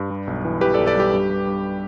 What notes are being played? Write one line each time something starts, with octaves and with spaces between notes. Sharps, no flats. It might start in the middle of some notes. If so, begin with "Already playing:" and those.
Already playing: G2
G3
B1
E3
E3 G4 B4
B1 A4 D5
A4 D5
G3 G4 B4
G2
G3
G2